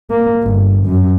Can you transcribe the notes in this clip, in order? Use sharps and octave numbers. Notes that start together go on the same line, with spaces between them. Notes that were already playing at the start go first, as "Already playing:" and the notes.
A#3
G1
F#2